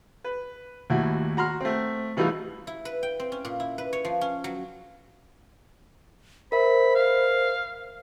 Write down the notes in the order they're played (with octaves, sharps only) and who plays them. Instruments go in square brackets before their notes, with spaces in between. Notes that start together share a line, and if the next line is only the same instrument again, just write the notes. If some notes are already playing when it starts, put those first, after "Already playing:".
[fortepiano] B4
D#2 A2 E4 F#4
F#4 A#5 C6 F6
A3 C4
B2 E3 G3 A3 D#4 F4
[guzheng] E4
B4
G5
C4
C#4
A#2
E4
B4
C#5
F3
C#4
F#3
[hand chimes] A#4 E5 [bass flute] C5 [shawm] B5
[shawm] F5